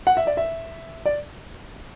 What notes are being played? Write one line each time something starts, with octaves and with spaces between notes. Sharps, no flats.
F#5
E5
D5
E5
D5